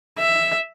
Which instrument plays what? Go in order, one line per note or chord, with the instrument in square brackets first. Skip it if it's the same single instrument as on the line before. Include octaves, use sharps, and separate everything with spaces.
[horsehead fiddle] E5